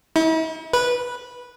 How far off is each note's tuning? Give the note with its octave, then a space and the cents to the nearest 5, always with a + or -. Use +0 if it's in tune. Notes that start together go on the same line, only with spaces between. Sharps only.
E4 -45
B4 -10